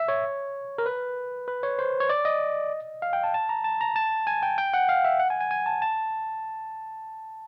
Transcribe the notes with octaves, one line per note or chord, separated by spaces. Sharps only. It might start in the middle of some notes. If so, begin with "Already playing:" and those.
Already playing: E5
C#5
A#4
B4
B4
C#5
C5
C#5
D5
D#5
F5
G5
A5
A5
A#5
A5
A#5
A5
G#5
G5
G5
F#5
F5
E5
F#5
G#5
G#5
G#5
A5
A5